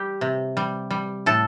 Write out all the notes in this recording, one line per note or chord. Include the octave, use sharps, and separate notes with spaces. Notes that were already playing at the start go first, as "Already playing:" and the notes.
Already playing: G3 G4
C3
G3
G3
A2 A4